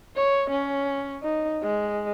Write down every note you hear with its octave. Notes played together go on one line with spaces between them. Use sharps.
C#5
C#4
D#4
G#3